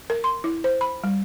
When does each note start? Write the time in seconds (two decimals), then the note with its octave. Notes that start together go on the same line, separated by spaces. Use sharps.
0.10 A#4
0.24 C6
0.44 E4
0.64 C5
0.81 B5
1.04 G3